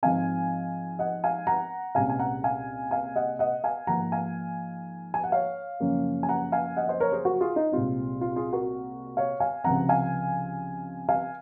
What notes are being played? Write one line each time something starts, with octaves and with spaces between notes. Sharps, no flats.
G#2 F3 C4 F5 G#5
D#5 F#5
F5 G#5
F#5 A#5
C2 A#2 G#3 C#4 F5 G#5
G#5
F#5 A#5
F5 G#5
F5 G#5
D#5 F#5
D#5 F#5
F5 G#5
G#2 F3 A#3 F#5 A#5
F5 G#5
G#5
F#5
C#5 F5
F#2 C#3 F3 A#3 C#4
G#5
F#5 A#5
F5 G#5
D#5 F#5
C5 D#5
A#4 C#5
G#4 C5
F#4 A#4
F4 G#4
D#4
C2 A#2 G#3 C4 F4
F4
F4 G#4
F#4 A#4
C#5 F5
F5 G#5
C#2 C3 F3 C4 F#5 A#5
F5 G#5
F5 G#5